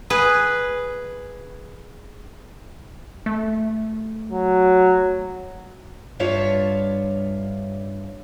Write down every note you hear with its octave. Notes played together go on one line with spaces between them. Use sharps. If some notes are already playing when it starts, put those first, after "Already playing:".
G#4 B4
A3
F#3
G2 D4 F4 C#5 E5